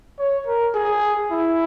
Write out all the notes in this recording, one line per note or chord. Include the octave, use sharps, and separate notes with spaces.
C#5
A#4
G#4
E4